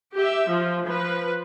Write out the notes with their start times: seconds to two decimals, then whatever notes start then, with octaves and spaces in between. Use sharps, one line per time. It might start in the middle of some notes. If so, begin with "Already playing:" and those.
0.15 G4 E5
0.48 F3
0.86 F3 B4